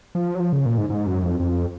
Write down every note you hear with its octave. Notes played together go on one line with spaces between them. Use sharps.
F3
F#3
F3
C#3
A#2
G#2
G#2
F#2
F2
F2